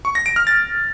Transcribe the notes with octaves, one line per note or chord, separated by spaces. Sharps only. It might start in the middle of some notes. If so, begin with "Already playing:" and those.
C#6
A#6
D7
F6
A6